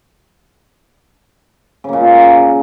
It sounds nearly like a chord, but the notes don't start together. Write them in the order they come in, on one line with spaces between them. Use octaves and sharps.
C#3 A#3 A#2